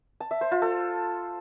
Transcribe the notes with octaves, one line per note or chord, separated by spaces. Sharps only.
A5
E5
C5
F4
A4